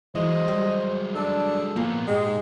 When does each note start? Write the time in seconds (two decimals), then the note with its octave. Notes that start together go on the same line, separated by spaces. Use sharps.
0.15 E3 F#3 G#3 C5 D#5
0.48 G3
1.15 D4 A4
1.76 A#2 F3 A#3 B3
2.07 G#2 G#3 G4